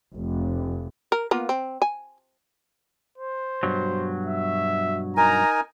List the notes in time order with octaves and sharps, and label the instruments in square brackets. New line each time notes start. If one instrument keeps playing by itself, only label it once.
[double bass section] F1
[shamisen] A#4
A#3 B3 F4
C4
G#5
[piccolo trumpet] C5
[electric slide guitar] G2 B2 F#3
[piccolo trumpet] E5
[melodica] D#4 A#4 G#5 [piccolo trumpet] A#5